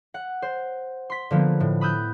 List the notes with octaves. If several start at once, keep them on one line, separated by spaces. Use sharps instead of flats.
F#5
C5
C6 B6
D3 F3 A#3 B3
A2
B5 D#6 E6 F#6 G6